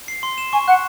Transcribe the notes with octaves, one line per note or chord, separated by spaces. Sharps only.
C7
C6
E7
G#5 C#6
F#5 F#6